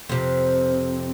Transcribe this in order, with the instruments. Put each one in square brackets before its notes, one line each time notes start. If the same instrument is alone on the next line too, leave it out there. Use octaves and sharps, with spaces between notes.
[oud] F2 C3